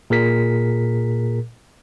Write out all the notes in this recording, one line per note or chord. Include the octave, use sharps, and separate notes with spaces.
A#2 G#4 A#4 B6